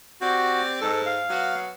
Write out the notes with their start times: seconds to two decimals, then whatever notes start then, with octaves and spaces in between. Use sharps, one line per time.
0.21 C4 F#4 G4 D5
0.81 G#2 A4
1.06 F5
1.29 F#3 B3 F#4